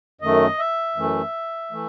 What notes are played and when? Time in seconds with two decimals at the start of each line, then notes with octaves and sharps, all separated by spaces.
0.21 F#2 D#3 A3 D#5
0.59 E5
0.96 F#2 E3 A3
1.71 E3 A3